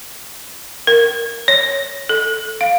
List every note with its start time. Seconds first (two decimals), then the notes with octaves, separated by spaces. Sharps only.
0.87 A#4
1.48 C#5
2.09 A4
2.61 F5